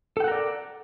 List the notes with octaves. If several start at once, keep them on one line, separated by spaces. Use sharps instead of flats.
A4 A#4 D5 F#5 G5